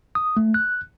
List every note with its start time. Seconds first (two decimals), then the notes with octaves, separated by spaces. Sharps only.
0.15 D#6
0.37 A3
0.54 F#6